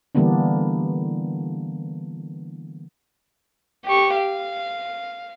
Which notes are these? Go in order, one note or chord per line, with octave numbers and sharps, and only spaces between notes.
D3 E3 G3 A#3 B3 D4
G4 C#6
F5